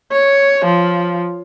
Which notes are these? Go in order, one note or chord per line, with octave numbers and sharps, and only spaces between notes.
C#5
F3